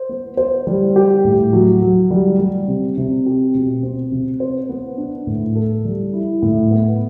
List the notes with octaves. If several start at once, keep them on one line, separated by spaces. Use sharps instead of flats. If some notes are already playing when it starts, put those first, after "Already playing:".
Already playing: C5
B3
C5
G3
G4
A2
F#3
F#3
G3
G3
C3
C3
G4
B2
C4
C3
C5
B3
D4
A2
A4
G3
E4
A2
B3